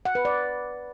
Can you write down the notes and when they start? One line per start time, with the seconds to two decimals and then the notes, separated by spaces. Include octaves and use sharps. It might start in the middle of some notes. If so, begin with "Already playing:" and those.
0.05 F#5
0.15 B4
0.25 D5